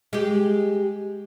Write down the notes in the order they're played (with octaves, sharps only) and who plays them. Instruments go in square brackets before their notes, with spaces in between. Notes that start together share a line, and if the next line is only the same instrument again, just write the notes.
[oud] G#3 G4